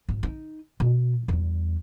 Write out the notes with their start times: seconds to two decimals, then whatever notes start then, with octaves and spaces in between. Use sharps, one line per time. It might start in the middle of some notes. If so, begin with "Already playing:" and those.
0.09 G#1
0.23 D#4
0.80 B2
1.28 E2 G3